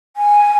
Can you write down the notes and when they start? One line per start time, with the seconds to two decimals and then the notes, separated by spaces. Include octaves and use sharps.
0.17 G#5